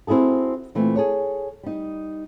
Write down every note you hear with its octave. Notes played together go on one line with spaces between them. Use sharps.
C4 E4 F#4 G#4 A4
A#2 E3 A3 C4
G#4 A4 C#5
G3 D#4